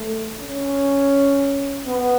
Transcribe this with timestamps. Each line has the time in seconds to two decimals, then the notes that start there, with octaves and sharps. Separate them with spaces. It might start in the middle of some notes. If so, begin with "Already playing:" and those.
Already playing: A3
0.40 C#4
1.86 B3